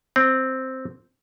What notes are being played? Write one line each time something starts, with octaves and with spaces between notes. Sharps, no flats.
C4